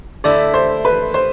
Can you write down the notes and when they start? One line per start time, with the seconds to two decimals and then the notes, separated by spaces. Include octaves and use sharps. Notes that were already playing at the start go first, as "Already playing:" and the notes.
0.24 D3 A3 E4 D5
0.54 C5
0.85 B4
1.14 C5